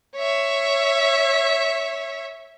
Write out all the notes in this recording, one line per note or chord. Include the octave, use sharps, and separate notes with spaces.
C#5 E5